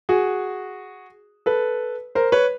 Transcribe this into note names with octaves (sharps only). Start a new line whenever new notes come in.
F#4 G#4
A4 B4
A#4 C5
B4 C#5